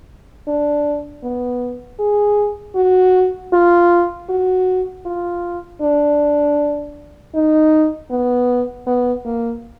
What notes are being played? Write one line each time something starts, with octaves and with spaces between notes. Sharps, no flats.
D4
B3
G#4
F#4
F4
F#4
F4
D4
D#4
B3
B3
A#3